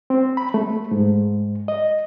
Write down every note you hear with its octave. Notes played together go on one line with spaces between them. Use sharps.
C4
B5
A3
G#2
D#5